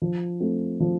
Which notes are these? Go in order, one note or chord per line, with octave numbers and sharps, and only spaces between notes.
F3
A3 C4
F3